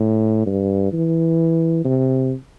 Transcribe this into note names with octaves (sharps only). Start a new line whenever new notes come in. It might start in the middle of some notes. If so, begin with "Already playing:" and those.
Already playing: A2
G2
E3
C3